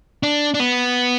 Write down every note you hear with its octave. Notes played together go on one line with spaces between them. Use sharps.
D4
D4
B3